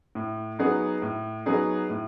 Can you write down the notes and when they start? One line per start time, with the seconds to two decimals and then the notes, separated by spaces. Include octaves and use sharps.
0.15 A2
0.59 F#3 B3 D#4 G#4
1.02 A2
1.46 F#3 B3 D#4 G#4
1.90 A2